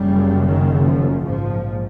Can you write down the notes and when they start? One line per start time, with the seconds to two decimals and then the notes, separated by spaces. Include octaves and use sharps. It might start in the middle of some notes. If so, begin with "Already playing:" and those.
Already playing: F#1 F#2 C#3 G3
0.45 D#3
0.85 F3
1.24 A#1 G#2 F3